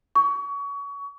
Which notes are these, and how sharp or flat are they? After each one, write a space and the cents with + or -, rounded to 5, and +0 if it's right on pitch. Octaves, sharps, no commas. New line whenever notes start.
C#6 +30